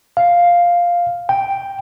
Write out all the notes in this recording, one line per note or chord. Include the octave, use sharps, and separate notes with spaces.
F5
G5